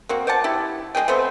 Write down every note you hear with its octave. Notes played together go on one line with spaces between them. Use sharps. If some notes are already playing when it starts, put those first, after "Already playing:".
A#3 C4 F#4
C5 D5 F#5 A5
E4 G4
G#3 C4 G#4 G5
A3 B3 C4 C5